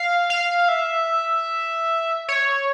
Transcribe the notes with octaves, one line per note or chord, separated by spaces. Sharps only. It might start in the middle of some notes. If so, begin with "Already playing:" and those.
Already playing: F5
F5
E5
C#5